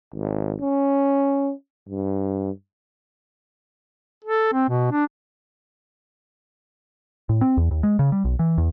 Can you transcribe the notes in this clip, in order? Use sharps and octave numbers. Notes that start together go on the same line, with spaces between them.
G#1
C#4
G2
A4
C4
B2
D4
A2
C4
E2
D#2
G#3
C#3
G3
B1
E3
E2